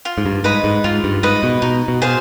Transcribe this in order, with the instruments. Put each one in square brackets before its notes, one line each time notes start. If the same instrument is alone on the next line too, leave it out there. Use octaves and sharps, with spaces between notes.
[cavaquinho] F4
[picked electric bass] G#2
G2
[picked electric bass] G#2 [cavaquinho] B4 D#5 B5
[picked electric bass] G#2
[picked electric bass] G#2 [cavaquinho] F4
[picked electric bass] G2
[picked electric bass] G#2 [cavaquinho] B4 D#5 B5
[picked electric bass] B2
[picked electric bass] B2 [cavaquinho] D#4
[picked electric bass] B2
[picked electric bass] B2 [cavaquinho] G#4 C5 F5